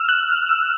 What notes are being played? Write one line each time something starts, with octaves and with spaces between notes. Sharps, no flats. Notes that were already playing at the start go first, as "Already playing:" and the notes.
Already playing: E6 F6
F#6
F6
E6